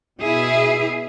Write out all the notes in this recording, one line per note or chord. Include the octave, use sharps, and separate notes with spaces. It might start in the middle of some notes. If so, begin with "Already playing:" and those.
B2 E4 G#4